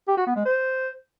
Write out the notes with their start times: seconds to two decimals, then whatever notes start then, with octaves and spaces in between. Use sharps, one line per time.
0.08 G4
0.17 F#4
0.27 B3
0.36 G#3
0.46 C5